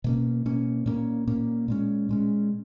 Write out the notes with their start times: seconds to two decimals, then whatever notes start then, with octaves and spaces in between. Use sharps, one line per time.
0.04 B2 A#3 C#4
0.45 B2 A#3 C#4
0.86 A#2 A#3 C#4
1.27 A#2 A#3 C#4
1.68 A#2 G#3 C#4
2.09 A#2 G#3 C#4